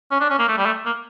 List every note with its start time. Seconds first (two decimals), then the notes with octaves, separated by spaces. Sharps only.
0.11 C#4
0.20 D4
0.30 C#4
0.39 A#3
0.48 A3
0.58 G3
0.66 A3
0.86 A#3